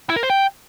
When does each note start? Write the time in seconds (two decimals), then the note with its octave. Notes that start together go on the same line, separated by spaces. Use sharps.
0.10 E4
0.16 A#4
0.23 C5
0.30 G5